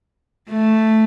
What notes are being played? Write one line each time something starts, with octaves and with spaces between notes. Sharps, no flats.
A3